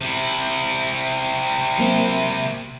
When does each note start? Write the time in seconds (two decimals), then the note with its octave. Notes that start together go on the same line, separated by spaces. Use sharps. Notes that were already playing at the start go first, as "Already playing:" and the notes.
0.01 C3 E4
1.78 F#3 A#3 C4